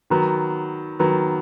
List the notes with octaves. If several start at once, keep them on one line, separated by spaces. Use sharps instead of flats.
D#3 F#3 B3
D#3 F#3 B3